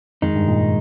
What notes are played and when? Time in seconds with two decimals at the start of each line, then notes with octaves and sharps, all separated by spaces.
0.22 F2 D#3 G#3 D#4
0.36 G2
0.48 A#2